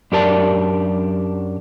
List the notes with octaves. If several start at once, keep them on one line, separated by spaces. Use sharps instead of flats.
F#2 D4 G4 A#4 D5 A5